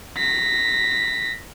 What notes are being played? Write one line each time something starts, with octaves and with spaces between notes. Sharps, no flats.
A#6 B6